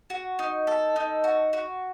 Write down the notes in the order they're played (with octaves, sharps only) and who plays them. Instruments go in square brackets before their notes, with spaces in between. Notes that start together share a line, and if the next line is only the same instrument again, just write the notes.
[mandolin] F#4
D#4
A4
D#4
F#4
F#4